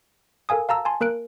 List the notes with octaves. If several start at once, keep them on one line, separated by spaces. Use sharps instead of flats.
A4 A#4 F5 G#5 D#6
F5 A5 A#5 E6
G#5 A5 C6
A#3 A#4 F#6 D7